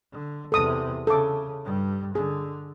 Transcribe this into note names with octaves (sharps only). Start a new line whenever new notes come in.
D3
E2 C3 A4 D#6
C#3 A4 D6
G2 G3
D3 G#4